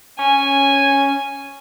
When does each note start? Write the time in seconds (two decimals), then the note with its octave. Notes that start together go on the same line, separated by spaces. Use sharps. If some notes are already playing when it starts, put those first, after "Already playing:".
0.19 C#4 G#5